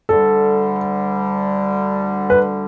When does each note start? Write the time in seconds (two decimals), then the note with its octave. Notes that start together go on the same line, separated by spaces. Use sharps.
0.09 D2 D3 G3 A4
2.30 B4